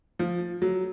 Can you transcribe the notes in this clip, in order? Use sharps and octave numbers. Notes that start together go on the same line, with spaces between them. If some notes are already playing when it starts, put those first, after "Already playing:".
F3
F#3